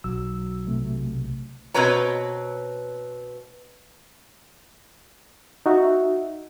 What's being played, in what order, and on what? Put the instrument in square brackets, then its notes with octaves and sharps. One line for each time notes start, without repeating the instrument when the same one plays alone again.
[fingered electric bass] B1 F#3 [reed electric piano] E6
[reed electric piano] C3 A3
[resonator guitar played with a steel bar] B2 C4 F#4 B4 C#5 A#5
[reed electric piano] D#4 F#4 E5